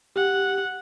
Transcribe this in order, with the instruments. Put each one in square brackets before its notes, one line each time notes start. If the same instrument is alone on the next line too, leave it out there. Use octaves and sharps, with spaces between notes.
[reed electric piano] G4 [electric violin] F#5